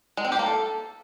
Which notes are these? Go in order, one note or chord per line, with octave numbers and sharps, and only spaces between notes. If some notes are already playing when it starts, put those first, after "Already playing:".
G#3
C4
G4
A#3
A4